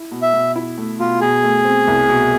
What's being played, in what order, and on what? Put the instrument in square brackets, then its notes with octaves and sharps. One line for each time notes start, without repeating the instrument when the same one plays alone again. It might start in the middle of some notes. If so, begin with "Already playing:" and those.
Already playing: [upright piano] E4
B2
[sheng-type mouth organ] E5
[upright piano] B2
E4
A3
[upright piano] B2 [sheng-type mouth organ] F4
[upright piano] B2 [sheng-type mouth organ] G#4
[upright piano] A3
C4
C2
B2